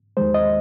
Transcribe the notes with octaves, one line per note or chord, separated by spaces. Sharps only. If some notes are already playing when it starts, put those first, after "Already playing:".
D#2 D#3 G#3 C5
D#5